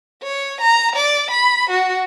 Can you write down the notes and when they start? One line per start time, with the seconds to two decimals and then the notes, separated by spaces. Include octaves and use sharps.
0.23 C#5
0.61 A#5
0.96 D5
1.31 B5
1.70 F#4